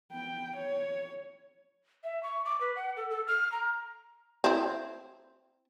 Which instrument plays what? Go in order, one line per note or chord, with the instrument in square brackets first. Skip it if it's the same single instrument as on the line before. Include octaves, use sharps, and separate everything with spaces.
[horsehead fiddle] B3 G5
C#5
[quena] E5
C#6
D6
B4
F#5
A4
A4
F6
A#5
[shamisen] C4 E4